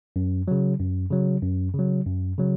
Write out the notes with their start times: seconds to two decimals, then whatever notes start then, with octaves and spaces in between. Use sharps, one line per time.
0.16 F#2
0.48 C#3 F#3
0.80 F#2
1.11 C#3 F#3
1.43 F#2
1.74 C#3 F#3
2.07 F#2
2.38 C#3 F#3